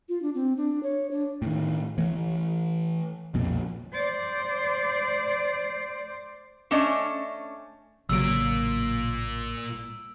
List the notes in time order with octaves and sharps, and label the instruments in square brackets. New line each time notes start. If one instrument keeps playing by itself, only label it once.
[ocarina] F4
D4
C4
D4
C#5
D4
[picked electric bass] A2 D#3
E3 A3
B1 F2 A#2
[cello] C5 D5
[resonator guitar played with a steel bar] A3 C#4 D4 D#5
[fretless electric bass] A1 C#3 F#3 [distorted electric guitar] A#2 A#3 [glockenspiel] E6 D7